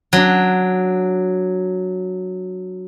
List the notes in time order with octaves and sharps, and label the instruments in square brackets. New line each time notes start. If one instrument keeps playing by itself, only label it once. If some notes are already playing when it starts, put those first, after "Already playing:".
[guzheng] F#3 D4